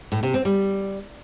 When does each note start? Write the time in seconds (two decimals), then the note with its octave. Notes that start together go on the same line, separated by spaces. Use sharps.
0.12 A2
0.23 C3
0.34 C4
0.45 G3